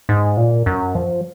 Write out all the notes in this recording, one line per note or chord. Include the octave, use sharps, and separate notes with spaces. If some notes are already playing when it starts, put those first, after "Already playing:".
G#2
A#2
F#2
F3